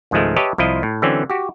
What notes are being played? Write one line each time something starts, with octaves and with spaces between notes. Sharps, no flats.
C#2 G#2 D#3 F3 G#3 A3
G4 B4 C#5 D#5 E5 A5
C2 F3 E4 F4 D#5
A2
D3 E3 F#3 C4 C#4
F#4 G4